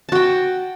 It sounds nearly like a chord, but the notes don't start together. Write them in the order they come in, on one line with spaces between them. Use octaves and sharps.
A5 F#4 G5